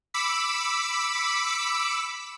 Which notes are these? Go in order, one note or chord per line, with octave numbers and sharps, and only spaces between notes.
B5 D6 E6 B6 C#7